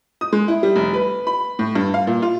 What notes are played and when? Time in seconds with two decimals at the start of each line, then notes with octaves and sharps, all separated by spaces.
0.21 D#6
0.33 G#3
0.48 E4
0.63 G3
0.76 F1
0.94 B4
1.27 B5
1.59 A2
1.75 G2
1.94 F5
2.07 A#2
2.22 F4